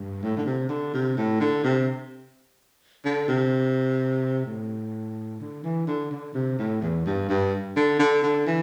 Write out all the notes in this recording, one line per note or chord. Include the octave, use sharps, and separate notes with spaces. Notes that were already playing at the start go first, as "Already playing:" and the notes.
Already playing: G2
A2
D3
C3
D3
C3
A2
D3
C3
D3
C3
A2
D3
E3
D3
D3
C3
A2
E2
G2
G2
D3
D3
D3
E3